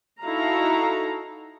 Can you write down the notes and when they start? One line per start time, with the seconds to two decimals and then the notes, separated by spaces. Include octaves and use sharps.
0.23 D#4 E4 F#4 A4 F5 A#5